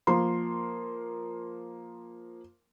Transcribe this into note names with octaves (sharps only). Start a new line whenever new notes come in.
F3 A#3 C6